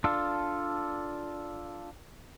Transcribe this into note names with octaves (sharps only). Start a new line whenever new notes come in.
D4 F4 A4